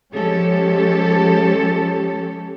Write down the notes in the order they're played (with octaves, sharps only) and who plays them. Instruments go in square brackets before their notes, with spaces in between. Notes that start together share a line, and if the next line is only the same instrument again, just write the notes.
[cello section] F3 G#3 C#4 G4 A4 C#5